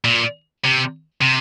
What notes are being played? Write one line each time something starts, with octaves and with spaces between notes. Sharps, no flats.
A#2
C3
C3